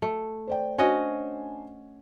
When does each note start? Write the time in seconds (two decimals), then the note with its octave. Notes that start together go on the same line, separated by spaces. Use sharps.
0.02 A3
0.47 C5 D5 G5
0.78 C#4 D4 F#4 C5 D#5 G#5